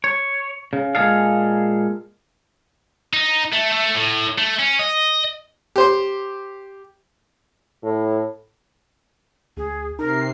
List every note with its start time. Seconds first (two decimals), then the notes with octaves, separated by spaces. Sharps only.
0.04 C#5
0.73 C#3
0.95 A#2 G3 G#3 G#4 A4 F5
3.14 D#4
3.52 A3
3.72 A3
3.95 A2
4.38 A3
4.59 C#4
4.79 D#5
5.76 G4 C5 C6
7.84 A2
9.57 D2 G#4
9.99 C3 D#4 A#4 C7